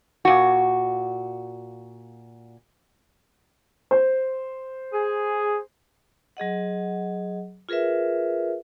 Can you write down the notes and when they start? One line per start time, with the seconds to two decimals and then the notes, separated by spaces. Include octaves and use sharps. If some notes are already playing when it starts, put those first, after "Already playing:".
0.25 A#2 F#4
3.91 C5
4.92 G#4
6.37 F#3 G#4 D#5 F#5
7.69 F4 G#4 A#4 B4 E5